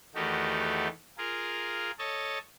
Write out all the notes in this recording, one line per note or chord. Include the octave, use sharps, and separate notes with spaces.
E2 D#3 A3 D#4 F#4 G4
F4 G#4 A#4
A4 C#5 D#5 A5